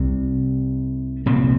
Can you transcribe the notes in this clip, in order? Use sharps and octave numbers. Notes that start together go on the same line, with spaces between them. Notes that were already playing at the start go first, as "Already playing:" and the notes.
Already playing: C2 C3 G3 C4
C2 A#2 F3 C4